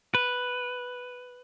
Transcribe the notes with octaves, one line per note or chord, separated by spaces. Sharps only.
B4